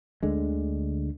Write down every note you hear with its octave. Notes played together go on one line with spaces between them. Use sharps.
D2 D3 G#3